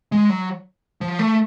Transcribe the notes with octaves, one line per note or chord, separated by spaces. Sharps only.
G#3
F#3
F3
A3